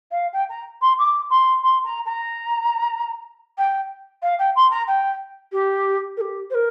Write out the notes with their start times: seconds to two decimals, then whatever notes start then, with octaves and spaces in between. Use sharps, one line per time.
0.11 F5
0.33 G5
0.49 A#5
0.81 C6
0.98 D6
1.29 C6
1.63 C6
1.84 A#5
2.05 A#5
3.57 G5
4.22 F5
4.39 G5
4.55 C6
4.70 A#5
4.87 G5
5.52 G4
6.17 A#4
6.20 G4
6.50 C5
6.54 A#4